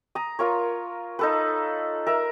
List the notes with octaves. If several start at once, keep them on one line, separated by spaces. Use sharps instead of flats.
A#5 D#6
F4 A#4 C#5
D#4 A4 B4
A#4 E5